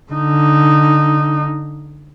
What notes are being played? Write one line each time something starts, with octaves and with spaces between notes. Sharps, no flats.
D3 D#4